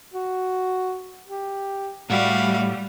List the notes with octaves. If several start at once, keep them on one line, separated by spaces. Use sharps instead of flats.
F#4
G4
A2 G3 A3 F#4 F5